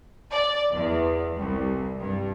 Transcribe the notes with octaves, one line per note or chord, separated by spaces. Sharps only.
D5
E2
C2
G2